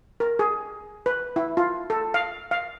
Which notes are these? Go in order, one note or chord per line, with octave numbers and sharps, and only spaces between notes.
A#4
G#4
B4
E4
F4
A4
F5
F5